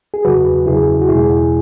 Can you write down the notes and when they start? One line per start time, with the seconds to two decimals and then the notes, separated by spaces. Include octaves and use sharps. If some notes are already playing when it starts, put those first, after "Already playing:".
0.14 G#4
0.25 E2 C#3 F#3 F#4 B4
0.66 E2 C#3 F#3 E4 G#4
1.02 F#4
1.08 E2 B2 G#3 E4 G#4